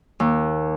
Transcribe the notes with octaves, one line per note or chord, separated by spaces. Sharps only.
D#2